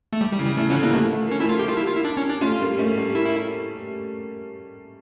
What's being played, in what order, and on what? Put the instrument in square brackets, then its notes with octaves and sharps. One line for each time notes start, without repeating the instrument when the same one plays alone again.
[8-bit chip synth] A3
G3
G3
[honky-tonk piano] C#3 E3
[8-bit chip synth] G3
[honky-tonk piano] C#3 E3 [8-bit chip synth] A3
[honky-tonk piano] D3 F3 [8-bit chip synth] C#4
[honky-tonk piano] E3 G3 [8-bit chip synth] A#3
[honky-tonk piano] F3 A3
A3
[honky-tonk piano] A#3 [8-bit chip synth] C#4
[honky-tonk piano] F3 A3 [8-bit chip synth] E4
[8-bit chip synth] F4
G4
[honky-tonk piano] G3 A#3 [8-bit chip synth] F4
[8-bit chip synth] E4
F4
E4
D4
C#4
D4
[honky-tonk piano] A3 C#4 [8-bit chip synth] F4
[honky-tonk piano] G3 A#3
A3 C#4
G3 A#3
[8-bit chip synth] E4